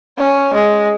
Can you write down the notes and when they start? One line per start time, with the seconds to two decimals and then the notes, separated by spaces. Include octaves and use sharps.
0.18 C#4
0.54 G#3